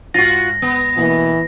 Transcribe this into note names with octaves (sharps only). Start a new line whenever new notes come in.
G#2 F4 F#4 A#6
B3
B2 E3 A#3 F#4